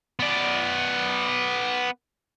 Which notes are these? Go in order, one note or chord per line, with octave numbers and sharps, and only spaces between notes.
B3 D5